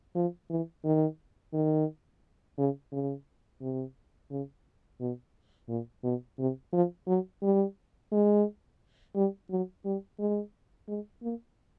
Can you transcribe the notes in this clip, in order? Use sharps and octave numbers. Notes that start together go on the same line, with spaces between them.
F3
E3
D#3
D#3
C#3
C#3
C3
C#3
B2
A#2
B2
C3
F3
F#3
G3
G#3
G3
F#3
G3
G#3
G#3
A#3